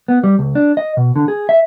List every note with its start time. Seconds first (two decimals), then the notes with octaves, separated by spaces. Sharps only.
0.08 B3
0.24 G3
0.39 C#2
0.55 D4
0.77 D#5
0.97 B2
1.16 D3
1.28 G#4
1.49 E5